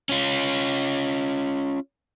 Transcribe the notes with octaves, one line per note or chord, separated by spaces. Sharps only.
C#4 F4